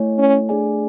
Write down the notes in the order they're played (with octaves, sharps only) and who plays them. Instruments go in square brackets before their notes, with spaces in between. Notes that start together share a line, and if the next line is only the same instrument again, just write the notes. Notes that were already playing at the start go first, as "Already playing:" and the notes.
Already playing: [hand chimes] A3 E4 A4 C#5 G#5
[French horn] C#4
[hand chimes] A3 D4 G#4 D5 G#5